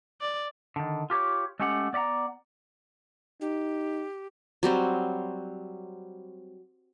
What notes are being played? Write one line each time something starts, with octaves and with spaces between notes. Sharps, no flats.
D5
D3 D#3
F4 G4 A4 C#5
G#3 A3 C#4 G4 F#5
B3 D5 D#5 F#5 A#5
D#4 G4
F#3 G3 C4